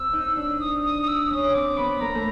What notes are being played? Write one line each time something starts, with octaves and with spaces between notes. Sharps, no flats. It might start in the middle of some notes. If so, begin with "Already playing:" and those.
Already playing: C4 E6
D#4
D4 E6
D#6
D#6
D#6
E6
C#4 D#6
C4 D6
B3 B5
A#3 A#5
A3